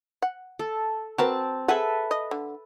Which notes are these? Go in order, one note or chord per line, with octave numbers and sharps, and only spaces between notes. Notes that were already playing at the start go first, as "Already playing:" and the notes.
F#5
A4
C4 F#4 A#4 B4 A5
G#4 A4 B4 E5 F#5
D#5
D3